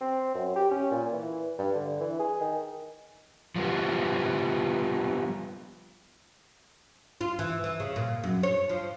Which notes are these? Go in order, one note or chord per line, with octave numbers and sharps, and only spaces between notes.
C4
F#2
G4
C#4
A#2
E3
G2
D3
E3
G#4
D#3
F3 G3 B3
F4
E3
E3
C#3
A#2
F#2
C#5
F3